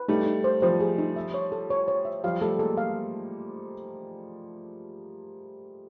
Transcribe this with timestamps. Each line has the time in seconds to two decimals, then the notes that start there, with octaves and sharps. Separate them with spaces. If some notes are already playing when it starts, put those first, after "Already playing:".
Already playing: B4
0.08 G3 A3 D#4
0.26 D#4
0.44 C5
0.62 F3 G3 C5
0.80 G#4
0.98 D#4
1.16 E5
1.34 C#5
1.52 A4
1.70 C#5
1.88 C#5
2.05 E5
2.24 F3 G3 F5
2.41 G3 A3 A4
2.59 G#3 A#3 A4
2.77 F5